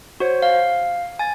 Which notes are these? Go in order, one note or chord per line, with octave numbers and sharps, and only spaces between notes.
F#4 C5 C#5
F5
G#5 A6